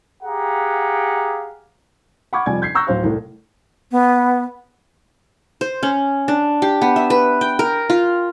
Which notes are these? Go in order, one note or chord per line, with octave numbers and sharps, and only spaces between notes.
G4 G#4 F5 F#5 A#5
F#5 B5 C#6 D6 F6 G#6
F2 C3 G3 D5 G#5 G#6
G6 G#6 B6 C7
A#5 C#6 E6 F#6 G6 A#6
D1 F#3 C5 F5
C2 A2 A3
B3
C5
C#4
D4
G4
B3
E5
B4
G5
A#4
F4